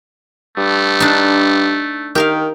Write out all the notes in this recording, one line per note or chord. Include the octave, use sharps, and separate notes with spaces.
G2 A3
D4 D#4
D#3 G4 A#4 F5